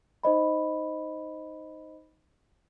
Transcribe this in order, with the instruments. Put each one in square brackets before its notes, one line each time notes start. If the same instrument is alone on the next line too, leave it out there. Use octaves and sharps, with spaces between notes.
[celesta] D#4 C5 D#5 B5